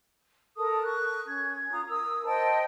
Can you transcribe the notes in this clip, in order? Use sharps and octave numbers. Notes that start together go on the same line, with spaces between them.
A4 A#4 A5 D#6
C#6 F#6
C#4 G#6
F4 A#5 D#6
A#4 D#6 E6
C5 D#5 G5 A5